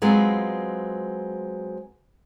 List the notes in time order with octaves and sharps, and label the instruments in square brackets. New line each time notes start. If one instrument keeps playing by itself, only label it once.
[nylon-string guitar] F#3 G#3 B3 C4 F4